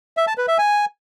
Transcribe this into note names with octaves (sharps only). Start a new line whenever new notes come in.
E5
A5
B4
E5
G#5